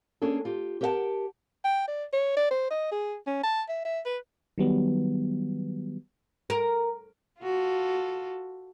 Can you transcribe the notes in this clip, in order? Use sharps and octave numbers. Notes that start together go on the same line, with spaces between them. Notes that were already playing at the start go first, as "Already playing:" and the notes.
A#3 C#4 D4 G#4 A4
F4 G4
G4 A#4 C5 E5 F#5 A5
G5
D5
C#5
D5
C5
D#5
G#4
C#4
A5
E5
E5
B4
D#3 F#3 G3 B3
A#4
F4 F#4 A4